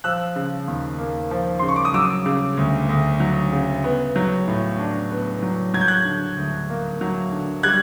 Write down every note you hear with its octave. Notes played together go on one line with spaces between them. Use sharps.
F3 E6 F#6
C#3
D#2
A#3
F3
C#3 C6
C#6
D6
D#6
F#3 D6 E6
C#3
D2
D2
F#3
C#3
B3
F#3
A2
D4
B3
F#3
F#3 G#6
G6
F#6 G#6
D3
D2
A#3
F#3
D3
G3 F#6 G#6